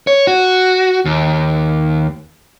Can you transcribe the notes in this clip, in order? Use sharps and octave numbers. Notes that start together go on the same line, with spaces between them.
C#5
F#4
D#2